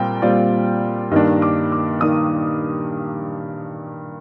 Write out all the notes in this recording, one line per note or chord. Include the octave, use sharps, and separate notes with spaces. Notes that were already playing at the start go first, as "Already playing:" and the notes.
Already playing: A#2 G3 C4 F4 G5
A#2 G3 C4 F4 D5
G2 D#3 A#3 D4 D#5
D6
D6
D#3 A#3 D4 D#6